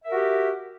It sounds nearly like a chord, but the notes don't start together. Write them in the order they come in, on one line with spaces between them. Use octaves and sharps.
E5 A#4 F#4 G4